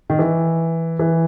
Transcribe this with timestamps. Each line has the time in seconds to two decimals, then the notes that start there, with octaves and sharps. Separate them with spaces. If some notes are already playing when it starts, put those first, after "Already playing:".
0.10 D#3
0.19 E3
0.99 E3